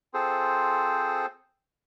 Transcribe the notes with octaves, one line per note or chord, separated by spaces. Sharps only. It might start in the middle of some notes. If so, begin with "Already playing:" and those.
C4 F4 G#4 A4 C5